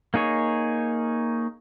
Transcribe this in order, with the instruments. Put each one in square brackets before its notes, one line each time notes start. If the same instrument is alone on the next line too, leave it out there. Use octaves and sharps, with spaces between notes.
[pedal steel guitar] A#3 D#4 G#4 C#5